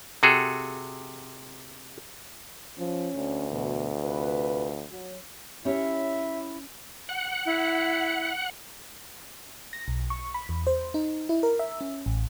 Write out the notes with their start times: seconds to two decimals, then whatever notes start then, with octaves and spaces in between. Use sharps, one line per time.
0.23 C3 F#4 G#4 A4
2.78 F3 C#4
3.16 D2
3.51 B2 E3
4.03 C3 F4 B4
4.91 F#3
5.65 C#4 E4 G4 C#5 E5
7.09 F#5
7.46 E4
9.73 A#6
9.88 B1
10.10 C#6
10.34 B5
10.49 E2
10.67 C5
10.94 D#4
11.29 E4
11.43 A#4
11.59 E5
11.81 C#4
12.06 A1